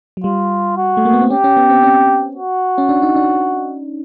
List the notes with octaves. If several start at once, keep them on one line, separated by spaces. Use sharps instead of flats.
F#3
G3 F4
F#4
A3
A#3
B3
C4
C#4 G4
C#4
B3
C4
C#4
F#4
C#4
D4
D#4
D4